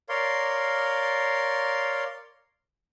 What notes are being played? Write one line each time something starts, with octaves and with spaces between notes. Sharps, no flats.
A#4 C#5 D5 F5 C6